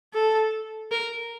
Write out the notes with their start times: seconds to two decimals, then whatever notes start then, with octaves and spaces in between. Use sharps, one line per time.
0.14 A4
0.91 A#4